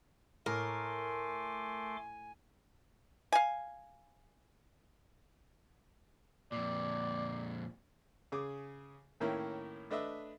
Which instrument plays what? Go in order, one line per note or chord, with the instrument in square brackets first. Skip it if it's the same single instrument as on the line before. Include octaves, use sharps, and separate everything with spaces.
[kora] A2 [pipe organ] A3 C6 D6 [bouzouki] A#4 [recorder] G#5
[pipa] F5 G#5
[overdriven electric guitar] F2 A#2 [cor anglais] D5
[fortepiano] C#3 G#4 D6
A2 D#3 A#3 C#4 E4
A3 D4 B4 D#5 E5